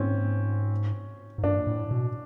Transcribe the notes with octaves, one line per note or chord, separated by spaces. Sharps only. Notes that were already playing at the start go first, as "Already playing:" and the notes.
Already playing: G#2 C4 C#4
G#2
G2 D4
A2
B2